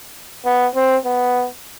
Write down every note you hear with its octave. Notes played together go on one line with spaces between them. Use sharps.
B3
C4
B3